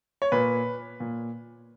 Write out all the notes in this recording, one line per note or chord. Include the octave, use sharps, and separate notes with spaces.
C#5
A#2 B4
A#2